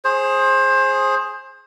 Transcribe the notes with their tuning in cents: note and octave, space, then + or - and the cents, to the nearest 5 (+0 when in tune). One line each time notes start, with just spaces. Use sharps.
G#4 +0 C5 +25